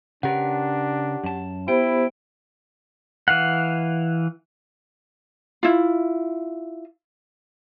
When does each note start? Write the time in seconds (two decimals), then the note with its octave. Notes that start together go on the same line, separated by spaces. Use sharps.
0.23 C#3 D4 G4 A#4 B4 F#5
1.24 F#2 A5
1.68 B3 E4 G4 C5 G5
3.28 E3 F5 F#5
5.63 E4 F4